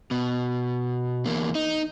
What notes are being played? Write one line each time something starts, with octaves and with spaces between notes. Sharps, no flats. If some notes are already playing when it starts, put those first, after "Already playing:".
B2
E2 A#3
D#4